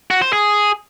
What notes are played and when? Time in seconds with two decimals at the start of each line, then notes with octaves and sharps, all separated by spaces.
0.10 F#4
0.22 C5
0.33 G#4